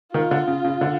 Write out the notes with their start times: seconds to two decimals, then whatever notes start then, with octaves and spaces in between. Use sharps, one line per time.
0.14 D#3 F4
0.31 D3
0.48 C#3
0.64 C#3
0.81 D3